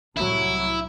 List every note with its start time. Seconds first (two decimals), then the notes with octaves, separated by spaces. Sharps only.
0.17 C2 A2 F#3 E4